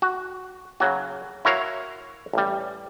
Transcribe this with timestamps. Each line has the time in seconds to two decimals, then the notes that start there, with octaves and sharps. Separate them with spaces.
0.02 F#4
0.80 C#3 F#3 F#4
1.45 E4 F#4 A#4 C#5 F5
2.33 A1 G3